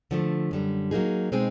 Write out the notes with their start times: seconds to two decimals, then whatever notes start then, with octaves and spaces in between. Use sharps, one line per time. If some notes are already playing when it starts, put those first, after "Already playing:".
0.11 D3 F3 A3
0.51 F#2 D3 G3
0.91 F#3 A#3 D#4 G#4
1.32 B2 G#3 C4 D#4 G#4